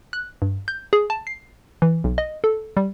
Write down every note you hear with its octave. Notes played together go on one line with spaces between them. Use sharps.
F#6
G2
G6
G#4
A5
C7
E3
B1
D#5
A4
G3